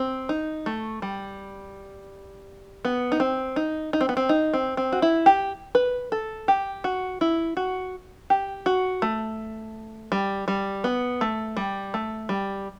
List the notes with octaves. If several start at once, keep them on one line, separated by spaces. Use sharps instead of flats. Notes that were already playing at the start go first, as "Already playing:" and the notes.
Already playing: C4
D#4
A3
G3
B3
D#4
C4
D#4
D#4
C4
B3
C4
D#4
C4
C4
F#4
E4
G4
B4
A4
G4
F#4
E4
F#4
G4
F#4
A3
G3
G3
B3
A3
G3
A3
G3